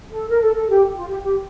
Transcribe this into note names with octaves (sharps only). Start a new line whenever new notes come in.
A4
A#4
A4
A4
G4
F4
G4
G4